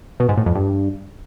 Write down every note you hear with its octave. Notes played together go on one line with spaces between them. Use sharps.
B2
G#2
A2
F2
G2